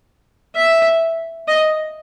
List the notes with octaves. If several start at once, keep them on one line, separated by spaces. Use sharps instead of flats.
E5
D#5